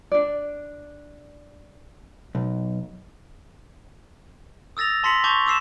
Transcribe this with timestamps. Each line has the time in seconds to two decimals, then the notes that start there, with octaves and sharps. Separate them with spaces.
0.12 D4 D5
2.35 B1
4.77 D#6 E6 A6 A#6 F7
5.04 A5 C6 A#6 B6 C#7 F#7
5.24 A5 C#6 D6 G6 F7 G7
5.46 D6 E6 C7 E7